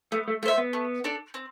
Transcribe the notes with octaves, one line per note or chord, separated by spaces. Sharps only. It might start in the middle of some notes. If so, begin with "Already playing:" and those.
A3 B3
A3
A3 F4 C5 E5
B3
A3
D4 A4 D5
C4